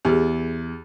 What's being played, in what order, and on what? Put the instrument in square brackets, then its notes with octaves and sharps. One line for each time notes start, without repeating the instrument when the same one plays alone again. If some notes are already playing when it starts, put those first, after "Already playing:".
[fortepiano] E2 [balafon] G4 G#4